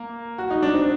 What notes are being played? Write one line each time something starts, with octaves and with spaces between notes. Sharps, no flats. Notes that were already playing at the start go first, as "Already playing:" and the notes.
Already playing: A#3
F#4
D#4
D4
C4